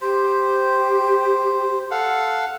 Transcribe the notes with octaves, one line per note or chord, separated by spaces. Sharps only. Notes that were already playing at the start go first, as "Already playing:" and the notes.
G4 C5
A4 F5 F#5